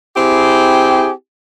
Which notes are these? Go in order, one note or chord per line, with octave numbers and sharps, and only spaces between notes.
C4 E4 G4 G#4